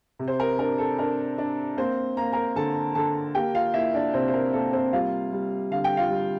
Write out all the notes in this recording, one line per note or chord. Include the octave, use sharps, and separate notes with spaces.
C3
C5
A#4
D4 A#4
A4
D4 A#4
D4
A#3 C4 C5
A#3 A#5
A#4 A#5
D3 A4 A5
D3 A4 A5
A#3 G4 G5
F4 F5
A#3 E4 E5
D4 D5
C3 C4 C5
C5
A#4
A#3 A4
C4 C5
G3 F4 F5
G3
D3 F5
G5
F4 F5
G3